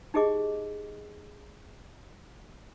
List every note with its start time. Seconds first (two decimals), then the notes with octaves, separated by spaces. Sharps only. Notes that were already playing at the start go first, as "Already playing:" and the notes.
0.14 D#4 G4 G#4 D#5 D6